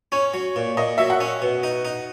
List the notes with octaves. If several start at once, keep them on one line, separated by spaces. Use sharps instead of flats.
C#4 C#5
F#3
A#2
A#2 D#5
F#3 E5
F#5
C#4
B2
D#4
D#4